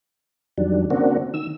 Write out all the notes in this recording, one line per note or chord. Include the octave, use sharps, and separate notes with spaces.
F2 D#3 F#3 G3 D4
C#3 A#3 C4 D4 F#4
D#3 E6